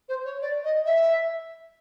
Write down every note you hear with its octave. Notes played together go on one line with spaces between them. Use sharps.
C5
C#5
D5
D#5
E5